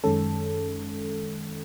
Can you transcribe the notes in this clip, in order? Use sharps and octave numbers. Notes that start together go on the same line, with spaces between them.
F#2 D#3 G#3 C#4 A4